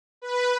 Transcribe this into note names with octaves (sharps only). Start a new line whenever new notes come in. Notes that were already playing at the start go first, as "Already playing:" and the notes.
B4